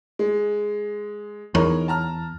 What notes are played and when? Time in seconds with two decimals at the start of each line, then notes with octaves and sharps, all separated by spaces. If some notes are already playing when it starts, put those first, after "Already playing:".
0.19 G#3
1.55 E2 D#4 A#4 C#5
1.88 A5 A#5 F6